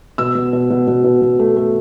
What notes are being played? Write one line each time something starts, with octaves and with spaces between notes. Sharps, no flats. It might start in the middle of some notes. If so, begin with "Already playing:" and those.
B2 E6
B2
B2
B2
B2
B2
B2
A3
A3